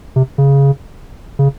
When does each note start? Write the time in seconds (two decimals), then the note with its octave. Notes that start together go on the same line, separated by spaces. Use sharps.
0.16 C3
0.38 C#3
1.39 C#3